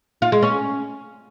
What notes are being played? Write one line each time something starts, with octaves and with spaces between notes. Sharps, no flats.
F4
G#3
C#4